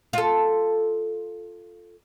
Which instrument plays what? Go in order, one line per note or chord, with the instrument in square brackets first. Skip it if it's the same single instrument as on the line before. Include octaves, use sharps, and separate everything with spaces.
[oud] F4 A4